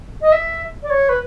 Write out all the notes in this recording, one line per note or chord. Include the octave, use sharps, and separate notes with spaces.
D#5
E5
D5
C#5
B4